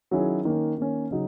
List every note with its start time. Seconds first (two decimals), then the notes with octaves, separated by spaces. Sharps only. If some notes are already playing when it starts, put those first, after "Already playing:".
0.11 D#3 F#3 C#4 E4 G#4
0.45 D#3 A#3 C#4
0.78 D#3 A#3 C#4
1.11 C#3 F#3 D#4